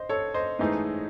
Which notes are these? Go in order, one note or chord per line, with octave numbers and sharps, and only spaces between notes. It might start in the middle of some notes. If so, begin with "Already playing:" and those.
Already playing: C5 D#5
A4 C#5
C5 D#5
G#2 E3 A3 D#4 G#4